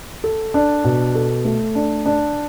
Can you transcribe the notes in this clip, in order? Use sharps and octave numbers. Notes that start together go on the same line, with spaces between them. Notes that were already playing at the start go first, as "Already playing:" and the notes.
A4
D4
B2
A4
A3
D4
D4